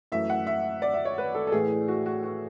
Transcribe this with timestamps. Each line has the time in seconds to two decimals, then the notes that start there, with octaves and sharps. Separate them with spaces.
0.12 F#2 E3 A3 E5
0.30 F#5
0.47 E5
0.82 D5
0.94 E5
1.05 C#5
1.18 B4
1.35 A4
1.47 A4
1.52 A2 E3 A3 G#4
1.88 F#4
2.06 F#4
2.23 F#4